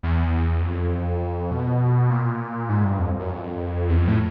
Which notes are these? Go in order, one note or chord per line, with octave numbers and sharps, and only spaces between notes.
E2
F2
B2
A#2
G#2
G2
F2
F#2
F2
E2
F2
A2